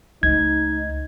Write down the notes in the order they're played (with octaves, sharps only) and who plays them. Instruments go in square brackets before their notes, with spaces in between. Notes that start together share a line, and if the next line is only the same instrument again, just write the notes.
[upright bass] C#2 A3 [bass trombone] D#4 [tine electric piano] G#6